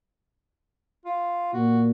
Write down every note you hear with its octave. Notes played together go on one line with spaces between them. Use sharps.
F4
A#2 F#4